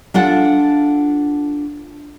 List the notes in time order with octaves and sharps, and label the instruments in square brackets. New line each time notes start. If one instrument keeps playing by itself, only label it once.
[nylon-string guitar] D4 F4 A4 F#5